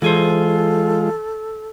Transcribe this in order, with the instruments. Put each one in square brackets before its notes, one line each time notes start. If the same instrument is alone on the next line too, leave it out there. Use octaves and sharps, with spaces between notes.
[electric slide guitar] E3 G#4 C5 [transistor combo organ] G#3 F4 [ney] A4